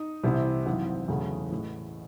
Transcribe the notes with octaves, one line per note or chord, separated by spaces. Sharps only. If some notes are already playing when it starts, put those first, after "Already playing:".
Already playing: D#4 D#6
C2 C3 E3 C4 E4
G#1 F#2 E3 C4 F#5
E1 E2 C#3 F#3 A3
A1 A2 E3